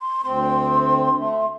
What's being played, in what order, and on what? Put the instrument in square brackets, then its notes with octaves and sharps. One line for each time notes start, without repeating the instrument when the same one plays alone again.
[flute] C6
[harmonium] D2 C4 [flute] C6
[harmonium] A3